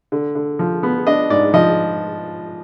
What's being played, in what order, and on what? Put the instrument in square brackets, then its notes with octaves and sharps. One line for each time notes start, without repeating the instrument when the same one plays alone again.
[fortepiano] D3
D3
F3
B3
D4 D#5
G#2 D5
F3 D#5